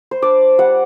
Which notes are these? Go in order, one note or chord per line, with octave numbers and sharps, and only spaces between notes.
C5
D4 D5
G3 F#5